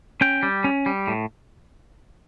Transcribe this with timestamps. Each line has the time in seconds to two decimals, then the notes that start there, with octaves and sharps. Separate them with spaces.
0.21 C#4 G5
0.43 G3
0.64 C#4
0.86 G3
1.07 A2